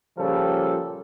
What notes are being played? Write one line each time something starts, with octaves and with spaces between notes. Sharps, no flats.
A#2 C#3 F3 G3 A4